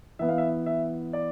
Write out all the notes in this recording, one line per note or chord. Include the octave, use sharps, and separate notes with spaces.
E3 B3 E5
F5
E5
E5
D5